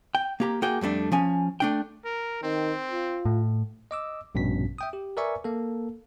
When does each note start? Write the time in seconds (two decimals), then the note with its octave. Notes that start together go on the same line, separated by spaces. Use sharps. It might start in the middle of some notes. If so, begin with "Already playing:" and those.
0.15 G5
0.40 A#3 G4 A#5
0.62 A#3 F#4 G#4 G5
0.81 F2 G3 A3 D4
1.12 F3 C#4 G#5
1.60 A3 D4 G5
2.05 A#4
2.43 D#3 C4
2.91 F4
3.25 A2
3.91 D#5 D6 E6
4.35 A#1 G2 B2 C#4 B6
4.78 E5 G5 D#6
4.93 G4
5.17 A#4 B4 D5 E5 G#5 C#6
5.44 A#3 A4